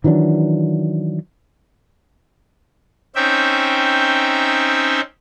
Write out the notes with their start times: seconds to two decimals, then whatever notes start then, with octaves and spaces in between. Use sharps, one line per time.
0.04 D#3 E3 F#3 D4
3.15 C4 C#4 D#4 E5 G5